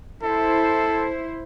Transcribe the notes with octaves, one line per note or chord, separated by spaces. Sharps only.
E4 A4 C5